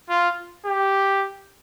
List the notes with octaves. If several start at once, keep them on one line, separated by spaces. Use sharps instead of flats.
F4
G4